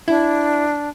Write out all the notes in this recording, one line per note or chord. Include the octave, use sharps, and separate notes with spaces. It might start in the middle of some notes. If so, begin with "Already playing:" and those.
D4 E4